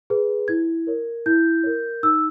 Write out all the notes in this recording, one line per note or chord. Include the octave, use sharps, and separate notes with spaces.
G#4 B4
E4 G#6
A#4 C#5
E4 G6
A#4 C#5
D#4 E6